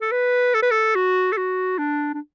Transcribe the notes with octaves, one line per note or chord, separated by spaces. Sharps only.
A4
B4
A4
B4
A4
F#4
A4
F#4
D4
D4